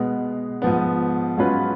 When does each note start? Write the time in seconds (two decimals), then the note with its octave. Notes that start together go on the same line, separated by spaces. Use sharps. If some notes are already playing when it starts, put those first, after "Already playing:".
Already playing: B2 G#3 B3
0.62 G#2 F3 B3
1.37 G#2 F#3 C#4 F4 B4